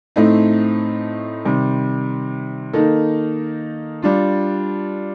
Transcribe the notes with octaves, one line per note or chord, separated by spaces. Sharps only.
A2 A3 C4 D#4
C3 D#3 G3
D#3 A#3 D#4 A4
G3 D4 F4